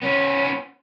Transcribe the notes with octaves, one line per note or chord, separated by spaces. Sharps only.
B3 C#4